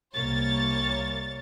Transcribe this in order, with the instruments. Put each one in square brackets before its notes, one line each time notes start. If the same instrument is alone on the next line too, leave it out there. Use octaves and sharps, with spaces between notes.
[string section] C2 A#3 C#5 A6